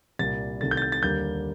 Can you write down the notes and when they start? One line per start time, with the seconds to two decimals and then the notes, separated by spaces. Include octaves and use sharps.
0.19 C2 A#2 G3 A6
0.61 C2 C3 D#3 A3 A6
0.71 G6
0.77 A6
0.82 G6
0.92 A6
1.02 D#2 D3 G3 A#3 G6